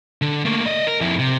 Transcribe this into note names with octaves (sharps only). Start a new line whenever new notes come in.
D3
A3 A#3
D5 D#5
A#4
F2 E4
C3